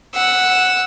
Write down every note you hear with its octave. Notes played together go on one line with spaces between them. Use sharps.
F#5 E6